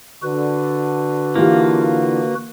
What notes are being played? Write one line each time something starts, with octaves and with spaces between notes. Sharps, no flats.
D3 F#4 B4
E3 A#3 F4 G4